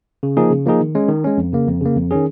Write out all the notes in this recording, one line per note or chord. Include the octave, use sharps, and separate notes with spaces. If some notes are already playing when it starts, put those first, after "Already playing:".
C#3
F3 A#3 D#4 G#4
C#3
F3 A#3 D#4 G#4
D#3
G#3 C#4
D#3
G#3 C#4
F2
C#3 A#3
F2
C#3 A#3
F2
D#3 C#4 G#4